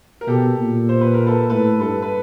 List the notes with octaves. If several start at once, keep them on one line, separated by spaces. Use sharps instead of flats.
A#4
B2 G4 A4
A#2
C5
B4
A#4
A4 B4
A2 A4 B4
G2 A4 B4
B4